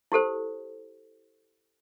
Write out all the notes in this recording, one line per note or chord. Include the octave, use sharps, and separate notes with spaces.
E4 G4 A4 C5